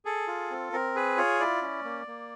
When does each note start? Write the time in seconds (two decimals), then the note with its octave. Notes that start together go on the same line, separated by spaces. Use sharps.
0.05 G#4 A4
0.27 F4
0.50 C4
0.73 C4 A#4
0.95 G#4 B4
1.17 F4 C#5
1.40 E4 D5
1.62 C#4
1.85 A#3
2.07 A#3